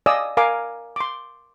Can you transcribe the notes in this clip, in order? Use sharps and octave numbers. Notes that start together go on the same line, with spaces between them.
D5 D#5 F5 G#5 D#6 E6
A#4 F5 G#5 D6
C6 D6